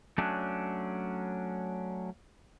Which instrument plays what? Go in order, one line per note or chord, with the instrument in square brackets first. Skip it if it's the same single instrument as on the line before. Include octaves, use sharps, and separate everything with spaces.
[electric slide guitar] F#3 A3 C#4 D4